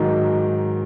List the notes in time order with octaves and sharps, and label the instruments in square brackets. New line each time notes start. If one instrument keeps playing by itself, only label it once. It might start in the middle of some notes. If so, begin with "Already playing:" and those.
Already playing: [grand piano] G#2 D#3 F#3